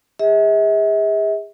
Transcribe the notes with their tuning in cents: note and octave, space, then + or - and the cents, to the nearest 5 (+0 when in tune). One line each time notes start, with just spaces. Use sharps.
G#4 -40 E5 -40